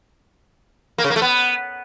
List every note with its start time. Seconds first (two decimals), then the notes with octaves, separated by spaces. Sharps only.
0.98 A#3
1.04 C#3
1.10 A#3
1.16 A3
1.22 B3